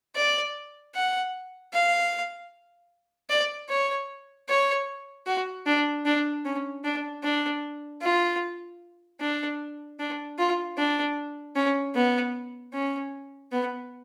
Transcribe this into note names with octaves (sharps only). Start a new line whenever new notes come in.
D5
F#5
F5
D5
C#5
C#5
F#4
D4
D4
C#4
D4
D4
F4
D4
D4
F4
D4
C#4
B3
C#4
B3